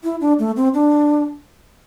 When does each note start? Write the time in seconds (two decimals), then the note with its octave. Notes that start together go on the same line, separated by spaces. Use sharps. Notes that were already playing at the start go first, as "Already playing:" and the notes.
0.04 E4
0.21 D4
0.39 A3
0.56 C4
0.74 D4